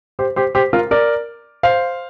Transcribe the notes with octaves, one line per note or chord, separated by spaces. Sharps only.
G4 C5
G4 C5
G4 C5
F4 A#4
A#4 D5
C5 F5